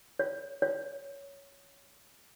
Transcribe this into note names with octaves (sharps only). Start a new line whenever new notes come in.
C#5
C#5